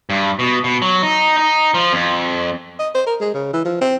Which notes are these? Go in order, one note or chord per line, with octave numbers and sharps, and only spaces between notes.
G2
B2
B2
F#3
D#4
D#4
F3
F2
D#5
C5
A#4
G#3
C#3
E3
F3
C4